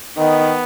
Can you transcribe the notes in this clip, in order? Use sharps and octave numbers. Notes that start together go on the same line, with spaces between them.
D#3 B3